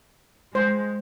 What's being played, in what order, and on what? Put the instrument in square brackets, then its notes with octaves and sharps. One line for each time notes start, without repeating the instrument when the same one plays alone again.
[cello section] G#3 [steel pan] C5